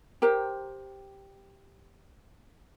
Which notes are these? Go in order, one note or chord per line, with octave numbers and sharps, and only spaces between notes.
G4 A#4 C5 G5